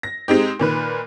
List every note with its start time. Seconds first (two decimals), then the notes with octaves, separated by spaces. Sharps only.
0.03 A#6
0.28 G#3 C4 D#4 G4
0.59 A#2 D#3 B4